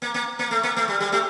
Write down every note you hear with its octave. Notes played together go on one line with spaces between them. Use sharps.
A#3
A#3
A#3
A3
A#3
A3
G3
G3
A3